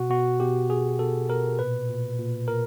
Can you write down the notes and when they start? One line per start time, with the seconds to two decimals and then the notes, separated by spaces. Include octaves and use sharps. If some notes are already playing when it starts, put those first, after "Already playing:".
Already playing: B2 F#4
0.10 B2 F#4
0.40 B2 G4
0.69 B2 G#4
0.99 B2 A4
1.29 B2 A#4
1.59 A#2 B4
1.89 A#2
2.19 A#2
2.48 A#2 A#4